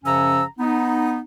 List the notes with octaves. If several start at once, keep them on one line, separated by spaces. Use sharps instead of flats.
F#2 C#3 F3 C#4 A#5 E6
B3 D#4